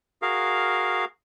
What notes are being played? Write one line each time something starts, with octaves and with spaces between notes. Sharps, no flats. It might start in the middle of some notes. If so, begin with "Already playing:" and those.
F#4 G#4 A#4 F5